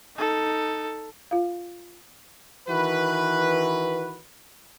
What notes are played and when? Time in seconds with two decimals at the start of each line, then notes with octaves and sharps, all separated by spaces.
0.16 D#4 A4
1.31 F4 F5
2.68 D#3 E3 F#4 B4